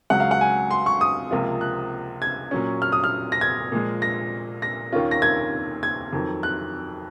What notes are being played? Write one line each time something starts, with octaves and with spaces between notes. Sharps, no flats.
C#2 C#3 F#3 F#5
F5
F#5
G#5
C6
C#6
D#6
C#2 C3 F3 A#3 F4
F#6
G#6
A#2 F#3 C#4
F6
D#6
F6
A#6
G#6
A#2 F3 G#3
A#6
A#6
D#2 D#3 A#3 C#4 F4
A#6
G#6
G#6
F2 D#3 F#3
F#6